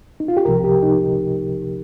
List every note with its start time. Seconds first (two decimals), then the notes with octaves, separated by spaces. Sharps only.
0.20 D#4
0.28 F4
0.37 G4
0.45 C2 C3 F3 A#4
0.64 G4
0.83 D#4